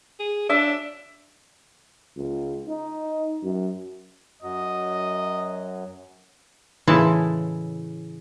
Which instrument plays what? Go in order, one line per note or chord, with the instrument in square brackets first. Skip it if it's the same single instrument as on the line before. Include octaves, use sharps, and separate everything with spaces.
[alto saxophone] G#4
[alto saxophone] D4 [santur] E5
[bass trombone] C#2
D#4
F#2
[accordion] F#2 F#3 [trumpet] D#5
[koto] A2 C#3 E3 G#3 E4 A5